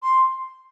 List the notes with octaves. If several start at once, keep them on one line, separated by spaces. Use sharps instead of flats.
C6